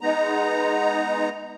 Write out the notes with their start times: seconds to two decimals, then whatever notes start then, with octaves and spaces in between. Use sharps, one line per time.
0.01 G#3 B3 D#4 A#5